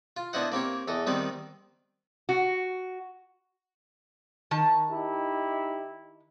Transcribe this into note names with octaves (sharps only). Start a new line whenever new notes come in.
F4
B3 D4 E4 C5 D#5 F#5
A#3 C4 G4 C#5
E2 A4 D#5
D#3 G3 B3 C4 B4
F#4
D#3 A5
D#4 E4 G4